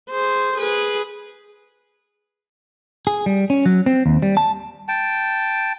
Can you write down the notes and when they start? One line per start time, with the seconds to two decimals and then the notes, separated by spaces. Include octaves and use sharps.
0.10 G#4 C5
0.58 G#4 B4
3.07 G#4
3.26 G3
3.50 C#4
3.66 F#3
3.86 C4
4.06 D#2
4.22 G3
4.37 A5
4.88 G5 A5